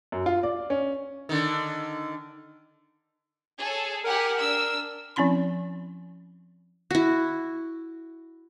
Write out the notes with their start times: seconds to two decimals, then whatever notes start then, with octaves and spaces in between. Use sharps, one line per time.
0.12 F#2
0.26 F4
0.43 D5
0.70 C#4
1.29 D3 D#3
3.59 G#4 A4 C#5
4.04 G4 A#4 F#5 G#5
4.40 D4 E6
5.16 F3 C4 C#4 E4 B5 C6
6.91 E4 F#4